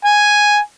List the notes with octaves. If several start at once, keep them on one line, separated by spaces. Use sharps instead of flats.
G#5